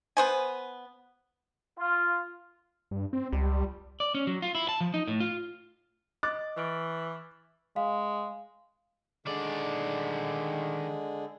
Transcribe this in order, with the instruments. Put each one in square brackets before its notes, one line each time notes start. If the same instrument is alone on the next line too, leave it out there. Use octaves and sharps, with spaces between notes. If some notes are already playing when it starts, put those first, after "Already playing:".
[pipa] B3 C5 G#5
[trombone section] F4
[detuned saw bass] G2
C4
[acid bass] C#2 [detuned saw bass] G3
[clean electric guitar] D5
C#4
F#3
F4
E4
A5
F3
D#4
A2
F4
[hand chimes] D#5 [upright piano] D6 F#6 A6
[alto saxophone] E3 [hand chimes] C#6 F6 D7
[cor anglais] G#3 [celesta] F5
[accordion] D3 G#3 [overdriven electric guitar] D#3 D5